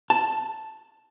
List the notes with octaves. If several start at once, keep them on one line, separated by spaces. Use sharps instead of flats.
A5